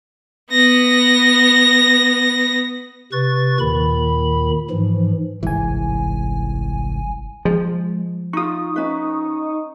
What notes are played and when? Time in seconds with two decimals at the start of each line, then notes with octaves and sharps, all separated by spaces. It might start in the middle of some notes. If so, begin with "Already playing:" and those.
0.50 B3 A#6
3.12 C3 B4 C#6 A6
3.59 D#2 A#2 D#3 B5
4.70 G#2 E3 F3
5.43 G1 C2 G#2 E3 G#5
7.45 F3 G#3
8.33 D#4 F4 C#6 D#6
8.76 C#4 D#4 B4